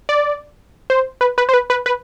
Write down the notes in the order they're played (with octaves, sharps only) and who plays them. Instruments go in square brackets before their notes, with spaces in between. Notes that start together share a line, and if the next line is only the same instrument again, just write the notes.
[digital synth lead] D5
C5
B4
B4
C5
B4
B4
B4